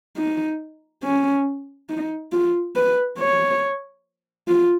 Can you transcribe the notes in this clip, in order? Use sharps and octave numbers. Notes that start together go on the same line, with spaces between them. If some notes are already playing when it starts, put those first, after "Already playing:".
D#4
C#4
D#4
F4
B4
C#5
F4